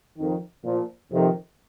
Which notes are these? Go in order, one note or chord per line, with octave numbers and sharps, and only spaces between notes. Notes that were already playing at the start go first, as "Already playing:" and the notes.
F2 D#3
A#2 F3
F2 C3 D#3